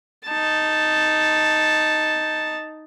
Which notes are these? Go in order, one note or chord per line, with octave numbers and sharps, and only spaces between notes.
D#4 A5